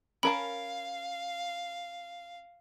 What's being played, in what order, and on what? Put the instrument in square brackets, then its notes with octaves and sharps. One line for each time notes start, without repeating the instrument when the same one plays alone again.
[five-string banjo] C#4 A#4 A5 [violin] F5 [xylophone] B5